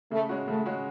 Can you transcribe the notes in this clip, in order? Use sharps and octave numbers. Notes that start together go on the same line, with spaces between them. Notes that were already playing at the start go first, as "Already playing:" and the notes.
C#3 A3
G#3 C#4 F#4
C#3 A3
G#3 C#4 F#4